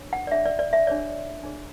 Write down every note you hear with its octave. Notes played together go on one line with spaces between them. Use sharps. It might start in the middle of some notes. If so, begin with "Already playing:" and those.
Already playing: D4 C#5
F#5
D5
D4 G#4 C#5 E5
D5
D5
E5
D4 G#4 C#5 D5
D4 G#4 C#5